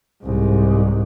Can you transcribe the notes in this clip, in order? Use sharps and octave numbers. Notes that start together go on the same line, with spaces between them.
C2 G#2